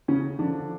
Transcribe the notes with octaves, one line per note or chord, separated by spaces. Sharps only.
C#3 C#4
D3 F3 D4